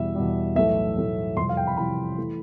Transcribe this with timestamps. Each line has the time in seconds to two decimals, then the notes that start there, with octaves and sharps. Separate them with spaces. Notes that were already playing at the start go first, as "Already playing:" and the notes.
Already playing: E2 B2 G3 E5
0.15 E2 B2 G3
0.56 B1 A2 E3 A3 E5
0.97 B1 A2 E3 A3
1.37 F2 C3 E3 G3 C6
1.49 F5
1.57 G5
1.67 B5
1.77 F2 C3 E3 G3 B5
2.18 E3 A3